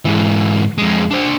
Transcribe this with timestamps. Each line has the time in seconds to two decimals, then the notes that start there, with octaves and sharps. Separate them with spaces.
0.05 G#2 E3
0.78 F2 G#3
1.11 D4 C5